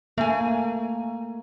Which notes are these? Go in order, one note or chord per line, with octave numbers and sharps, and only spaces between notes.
A3 A#3 G#5